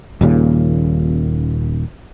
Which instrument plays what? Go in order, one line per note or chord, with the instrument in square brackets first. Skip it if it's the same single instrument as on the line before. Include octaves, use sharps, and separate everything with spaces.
[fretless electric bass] D#1 D#2 A#2 C#3